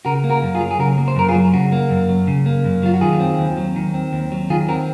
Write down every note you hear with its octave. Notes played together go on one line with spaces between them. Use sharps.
C#3 F#4 A#4
A#3
F#4 A#4
F#2
F4 G#4
F#3
G#4
C#3 F#4 A#4
A#3
C5
F#2 A#4
F4 G#4
F#3
C#3 F#4
A#3
F#2
F#3
C#3
A#3
F#2
F#3 F4
F#4
D#3 F4 G#4
C4
D#2
F#3
D#3
C4
D#2
F#3
D#3 F4 G#4
C4 F#4 A#4